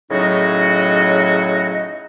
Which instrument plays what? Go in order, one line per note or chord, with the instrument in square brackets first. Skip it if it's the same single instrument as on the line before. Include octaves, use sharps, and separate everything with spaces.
[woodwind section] A2 C#3 F#3 D#4 F#4 D#5